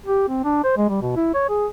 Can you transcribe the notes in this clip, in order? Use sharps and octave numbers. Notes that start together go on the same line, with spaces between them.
G4
C4
D4
C5
G#3
G3
B2
E4
C#5
G#4